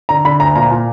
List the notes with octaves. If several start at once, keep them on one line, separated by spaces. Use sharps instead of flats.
D3 A#5
D3 B5
D2 A#5
A#2 A#5
A#2